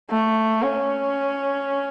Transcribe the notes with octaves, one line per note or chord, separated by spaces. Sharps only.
A3
C#4